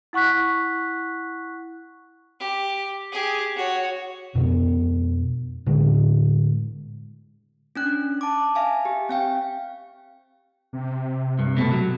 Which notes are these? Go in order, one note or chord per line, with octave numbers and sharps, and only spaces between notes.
E4 F#5 C#6 F#6 B6
G4
G4 G#4
F#4 C#5
F2 B2 B3
A2 D3 G#3
C#4 D4 F#6
A5 D6
E5 F5 G#5
G4
C4 F5 G5
C3
G2
B2 A3
F#3